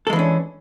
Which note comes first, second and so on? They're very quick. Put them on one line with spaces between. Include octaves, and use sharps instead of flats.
A4 G#3 E3 D4 C#4